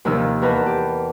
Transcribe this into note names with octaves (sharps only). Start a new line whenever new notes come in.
D#2 C3 D#3 F3 D#4 E6
E2 A#4 B4 D#5 A5
G4